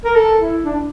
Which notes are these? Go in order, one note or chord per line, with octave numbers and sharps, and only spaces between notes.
A#4
A4
E4
D4